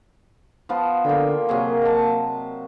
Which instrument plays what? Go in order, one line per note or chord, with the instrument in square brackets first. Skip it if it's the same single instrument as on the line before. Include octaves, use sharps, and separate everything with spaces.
[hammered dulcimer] F3 B3 F4
[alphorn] D3 [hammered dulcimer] A#3 G5
[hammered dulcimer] C3 F#3 G#4 [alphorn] A#3
[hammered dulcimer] D#5 A5